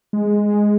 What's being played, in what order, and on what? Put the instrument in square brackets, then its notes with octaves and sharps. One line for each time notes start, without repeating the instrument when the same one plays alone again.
[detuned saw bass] G#3